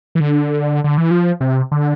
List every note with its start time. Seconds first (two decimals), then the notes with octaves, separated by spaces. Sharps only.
0.15 E3
0.20 D3
0.84 D3
0.98 E3
1.11 F3
1.41 C3
1.71 D3